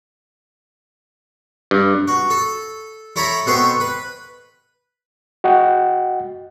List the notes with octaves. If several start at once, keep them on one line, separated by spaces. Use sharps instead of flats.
G2
F#4
A4
E4 A4 C#5 A#5 B5
B2 B3 C4 A4 C6 C#6
B4
F#4 D#5 F#5 G5